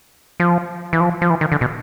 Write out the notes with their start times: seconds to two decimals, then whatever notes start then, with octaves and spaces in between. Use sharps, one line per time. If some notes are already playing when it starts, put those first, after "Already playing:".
0.40 F3
0.93 E3
1.00 F3
1.22 F3
1.30 E3
1.41 D#3
1.52 D3
1.61 B2